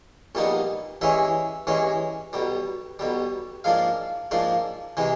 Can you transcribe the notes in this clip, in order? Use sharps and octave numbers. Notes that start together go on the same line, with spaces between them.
A#1 A#2 G3 B3 D#4
G2 E3 G#3 C#4 E5
G2 E3 G#3 C#4
B1 B2 G3
B1 B2 G3
G#2 F3 A#3 D4 F5
G#2 F3 A#3 D4
C3 E3 G#3